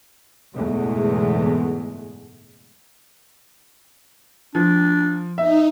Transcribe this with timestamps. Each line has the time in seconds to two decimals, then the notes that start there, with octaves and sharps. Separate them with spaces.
0.55 F#1 E2 G#2 B2 G#3 A3
4.55 F3 D4
5.38 D#4 E5